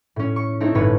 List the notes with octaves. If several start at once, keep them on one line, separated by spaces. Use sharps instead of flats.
A2 C#4
C#6
A3 C4 D#4 E4
G1 A2 B4 C#5